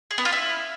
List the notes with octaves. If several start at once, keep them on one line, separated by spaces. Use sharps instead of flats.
G#4
B3
F4
E4